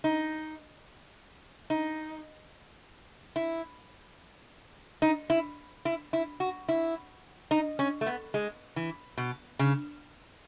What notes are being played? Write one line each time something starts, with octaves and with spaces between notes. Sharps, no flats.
D#4
D#4
E4
D#4
E4
E4
E4
F#4
E4
D#4
C#4
A3
B3
G#3
E3
B2
C#3